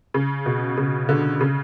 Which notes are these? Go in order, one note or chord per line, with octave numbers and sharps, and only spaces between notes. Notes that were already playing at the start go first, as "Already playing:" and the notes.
C#3
B2
C#3
D3
C#3